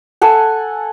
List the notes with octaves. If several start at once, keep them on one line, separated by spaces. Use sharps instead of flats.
A4 F#5 G#5